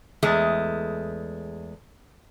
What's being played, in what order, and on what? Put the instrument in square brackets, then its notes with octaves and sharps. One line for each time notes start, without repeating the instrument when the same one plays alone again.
[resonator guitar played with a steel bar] E2 G#3 A3